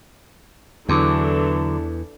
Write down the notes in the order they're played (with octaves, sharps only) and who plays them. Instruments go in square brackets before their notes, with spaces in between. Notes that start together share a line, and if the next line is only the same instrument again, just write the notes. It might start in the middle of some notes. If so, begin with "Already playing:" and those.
[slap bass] E2 [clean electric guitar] D3 F#3 [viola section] E3 D4 A4